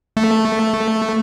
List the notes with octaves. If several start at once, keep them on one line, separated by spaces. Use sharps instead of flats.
A3